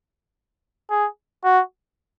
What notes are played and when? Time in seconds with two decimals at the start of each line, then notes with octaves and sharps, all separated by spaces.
0.91 G#4
1.44 F#4